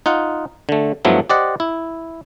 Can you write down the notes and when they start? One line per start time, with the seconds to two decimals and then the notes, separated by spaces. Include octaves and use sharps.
0.06 D#4 F4 F#5
0.69 D3 A3
1.05 G2 F3 F#3 A3 B3 E4
1.30 G4 C5 D5 D#5 F#5
1.60 E4